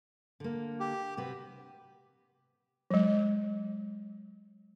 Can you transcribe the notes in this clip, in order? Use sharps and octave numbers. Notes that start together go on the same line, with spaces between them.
D3 A#3
G4
C3 F#4 B4
F#3 G#3